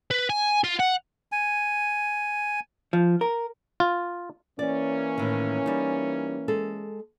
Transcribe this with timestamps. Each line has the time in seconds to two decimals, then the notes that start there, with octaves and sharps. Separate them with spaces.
0.11 B4
0.30 G#5
0.64 F4
0.80 F#5
1.32 G#5
2.93 F3
3.21 A#4
3.80 F4
4.59 E3 A#3 C#4 D5
5.18 A2 D#3
5.66 G3 D#4
6.48 G#3 A4